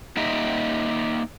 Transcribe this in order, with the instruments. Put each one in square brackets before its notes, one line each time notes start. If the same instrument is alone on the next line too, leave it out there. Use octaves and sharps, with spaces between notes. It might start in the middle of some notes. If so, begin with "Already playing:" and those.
[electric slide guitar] A#3 D#4 G4 D#5 E5